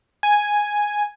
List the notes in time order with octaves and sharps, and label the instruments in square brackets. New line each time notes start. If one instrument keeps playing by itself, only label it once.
[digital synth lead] G#5